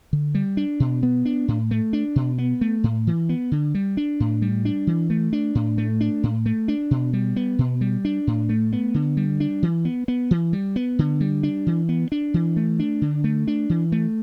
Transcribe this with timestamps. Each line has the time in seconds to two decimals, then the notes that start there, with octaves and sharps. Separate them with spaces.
0.13 D3
0.35 G3
0.57 D4
0.80 B2
1.03 B3
1.25 D4
1.48 A2
1.71 A3
1.93 D4
2.16 B2
2.38 B3
2.61 A3
2.84 A2
3.07 E3
3.29 B3
3.52 D3
3.74 G3
3.97 D4
4.20 A2
4.42 G3
4.65 D4
4.87 E3
5.10 A3
5.33 D4
5.55 A2
5.78 A3
6.01 D4
6.23 A2
6.46 A3
6.68 D4
6.91 B2
7.13 G3
7.36 B3
7.59 B2
7.81 G3
8.05 D4
8.27 A2
8.49 A3
8.73 B3
8.94 D3
9.17 G3
9.40 D4
9.63 E3
9.85 B3
10.08 B3
10.31 E3
10.53 G3
10.76 B3
10.99 D3
11.21 G3
11.43 D4
11.67 E3
11.89 B3
12.12 D4
12.34 E3
12.56 A3
12.79 D4
13.02 D3
13.24 A3
13.47 D4
13.70 E3
13.92 A3